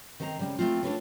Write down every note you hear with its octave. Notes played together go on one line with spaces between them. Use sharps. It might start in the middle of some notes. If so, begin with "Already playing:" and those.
D#3 C4 C5 A5 A#5
C#3 G3 C4
A3 C4 F4
D4 F4 G4 A4 B4 C#5